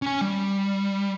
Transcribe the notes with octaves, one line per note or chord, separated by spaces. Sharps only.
C#4 G#5
G3